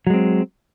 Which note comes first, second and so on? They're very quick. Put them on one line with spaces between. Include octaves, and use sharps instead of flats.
F#3 G#3 C4